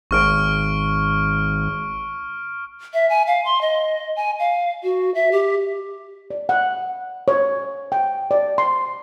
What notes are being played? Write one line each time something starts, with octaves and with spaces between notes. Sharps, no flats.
G#1 C#6 F6 D7
E5
G#5
F5
C6
D#5
G#5
F5
F#4
E5
G4
D5
F#5
C#5
G5
D5
C6